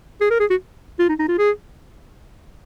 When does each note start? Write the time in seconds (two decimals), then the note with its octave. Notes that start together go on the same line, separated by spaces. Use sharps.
0.21 G#4
0.31 A#4
0.40 G#4
0.50 F#4
0.99 F4
1.09 D#4
1.19 D#4
1.28 F4
1.38 G#4